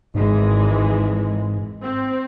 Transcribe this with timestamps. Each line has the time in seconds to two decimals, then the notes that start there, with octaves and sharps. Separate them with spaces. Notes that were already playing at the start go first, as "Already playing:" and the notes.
0.15 G#1 G#2 E3 G#3
1.84 C4